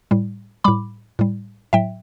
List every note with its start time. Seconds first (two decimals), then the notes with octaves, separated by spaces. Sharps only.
0.11 A2 G3
0.64 A2 G3 B5 D6
1.19 A2 G3
1.73 A2 F#3 E5 G5